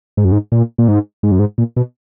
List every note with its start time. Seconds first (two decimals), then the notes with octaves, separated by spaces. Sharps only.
0.17 G#2
0.25 F#2
0.32 G#2
0.52 A#2
0.78 A#2
0.88 G#2
1.23 G#2
1.31 F#2
1.39 G#2
1.58 A#2
1.76 B2